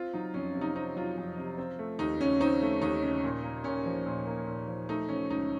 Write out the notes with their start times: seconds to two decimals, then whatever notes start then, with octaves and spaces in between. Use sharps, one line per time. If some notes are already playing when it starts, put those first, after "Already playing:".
Already playing: C4 F4
0.13 F#3 D#4
0.34 F2 C#4
0.55 C3
0.61 D#4
0.75 C4 D#4
0.96 F#3 F4
1.17 F2
1.38 C3
1.58 C4
1.79 A3
1.99 D#2 D#4
2.20 C#3 C#4
2.40 C4 D#4
2.61 A3
2.82 D#2 D#4
3.02 C#3
3.24 A#2
3.44 A#3
3.64 A#2 C#4
3.86 F3
4.06 A#2
4.27 A#3
4.47 A#2
4.68 F3
4.89 A3 D#4
5.09 F3 C#4
5.30 C#2 D#4